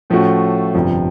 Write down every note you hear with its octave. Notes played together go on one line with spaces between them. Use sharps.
A2 F3 A3 C#4 F#4
G1 F2 C3 F3